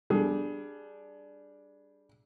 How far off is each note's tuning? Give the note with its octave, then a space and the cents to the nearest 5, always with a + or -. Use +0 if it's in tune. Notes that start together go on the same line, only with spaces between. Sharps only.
G3 +0 D4 +0 G#4 +20